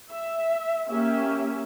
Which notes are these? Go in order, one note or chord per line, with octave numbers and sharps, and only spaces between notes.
E5
A#3 C#4 G4 E5